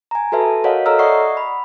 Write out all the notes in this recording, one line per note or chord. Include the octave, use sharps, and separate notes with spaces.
G#5 A#5
F#4 A4 B4 E5 A5
F#4 A#4 C#5 D#5 F5 F#5
A4 C#5 D#5 A#5 E6 F6
D5 E5 F#5 C#6 D#6 C7
B5